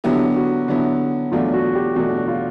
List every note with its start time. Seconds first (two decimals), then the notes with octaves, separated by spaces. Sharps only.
0.04 D3 F#3 B3 E4 G4
0.36 F#4
0.68 D3 F#3 B3 E4
1.32 E2 B2 F#3 A3 D4 F4
1.54 F#4
1.75 G4
1.96 E2 B2 F#3 A3 D4 F#4
2.28 F4